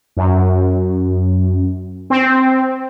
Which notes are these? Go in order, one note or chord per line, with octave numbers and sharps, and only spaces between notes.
F#2
C4